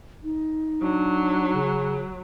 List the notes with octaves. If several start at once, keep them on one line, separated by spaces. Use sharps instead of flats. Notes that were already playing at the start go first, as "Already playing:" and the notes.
D#4
F#3 D4
C#3